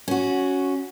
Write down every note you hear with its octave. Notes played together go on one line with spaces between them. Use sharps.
C#4 F#4